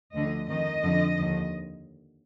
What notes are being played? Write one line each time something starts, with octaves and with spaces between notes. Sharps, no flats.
D2 D3 F3 D#5
F2 D#3 D#5
F2 D3 F3
D#2 D3 F3